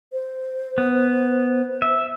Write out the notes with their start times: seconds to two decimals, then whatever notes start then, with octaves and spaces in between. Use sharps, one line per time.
0.13 C5
0.78 B3
1.82 E5